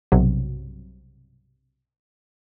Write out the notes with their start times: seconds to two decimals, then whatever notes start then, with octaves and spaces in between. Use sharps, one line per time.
0.12 B1 G2 C3 F#3